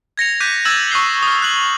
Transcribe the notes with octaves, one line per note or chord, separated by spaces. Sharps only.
G#6 A#6 C#7 F7
D6 F#6 G6 B6 D#7
E6 F#6 G#6 A6 E7 F#7
C#6 D#6 F#6 C7 G7
D#6 F6
F#6 F#7